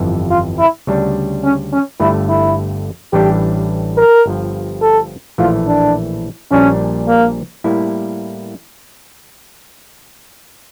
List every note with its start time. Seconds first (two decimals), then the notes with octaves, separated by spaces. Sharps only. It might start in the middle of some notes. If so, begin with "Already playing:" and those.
Already playing: G1 F2 E3
0.30 F4
0.59 E4
0.87 D2 C#3 G3 D4
1.44 C#4
1.73 C#4
2.00 G1 G2 D3 A3 E4
2.29 E4
3.13 A1 A2 E3 G3 D4 G4
3.97 A#4
4.26 G1 G2 F3
4.82 A4
5.38 A#1 A2 E3 A3 F4
5.67 D4
6.51 A#1 A#2 G3 C#4 D4
7.08 A#3
7.64 A2 G3 A#3 E4